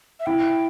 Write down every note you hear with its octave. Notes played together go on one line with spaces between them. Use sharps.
E5
E4 G5